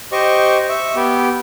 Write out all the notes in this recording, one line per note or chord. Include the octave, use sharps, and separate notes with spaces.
G4 C5 D#5 C#6
E5 C#6
B3 G4